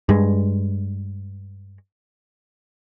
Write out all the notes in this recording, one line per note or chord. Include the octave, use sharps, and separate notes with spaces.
G2 G#3